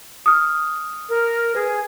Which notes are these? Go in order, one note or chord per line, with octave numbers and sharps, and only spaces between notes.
D#6 F6
A#4
G#4 B4